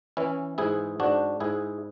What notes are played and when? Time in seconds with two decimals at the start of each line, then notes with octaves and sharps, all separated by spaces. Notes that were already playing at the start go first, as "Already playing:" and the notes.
0.17 E3 C#4 E4
0.58 G#2 E4 G#4
1.00 G#2 D4 F#4
1.40 G#2 E4 G#4